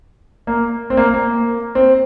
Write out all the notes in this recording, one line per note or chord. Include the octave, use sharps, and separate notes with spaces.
A#3
C4
A#3
A#3
C4